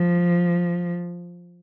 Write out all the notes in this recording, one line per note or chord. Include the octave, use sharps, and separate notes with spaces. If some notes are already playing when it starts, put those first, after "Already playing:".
Already playing: F3